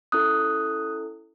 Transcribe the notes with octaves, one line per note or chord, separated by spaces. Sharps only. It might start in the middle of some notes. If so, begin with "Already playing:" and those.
C#4 E4 A4 D#6 F#6